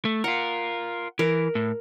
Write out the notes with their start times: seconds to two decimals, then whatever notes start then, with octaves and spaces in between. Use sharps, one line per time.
0.05 A3
0.24 F4 A#4 F#5
1.19 E3 A#4
1.55 A2